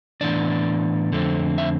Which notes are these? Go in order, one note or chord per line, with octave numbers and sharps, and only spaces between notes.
A2 E3 B3 D4 D5
F2 D3 A3 C4
E5